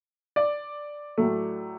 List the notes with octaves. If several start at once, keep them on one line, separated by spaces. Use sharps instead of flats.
D5
A2 F#3 A3